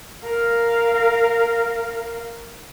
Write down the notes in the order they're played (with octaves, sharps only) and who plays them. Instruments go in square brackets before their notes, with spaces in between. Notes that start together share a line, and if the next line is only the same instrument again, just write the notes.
[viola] A#4 F5